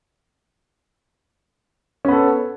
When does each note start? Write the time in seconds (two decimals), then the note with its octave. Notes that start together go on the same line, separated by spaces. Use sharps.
2.05 C#4
2.08 B3
2.12 A4